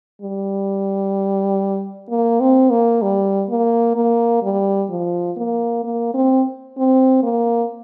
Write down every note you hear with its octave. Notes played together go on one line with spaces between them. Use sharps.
G3
A#3
C4
A#3
G3
A#3
A#3
G3
F3
A#3
A#3
C4
C4
A#3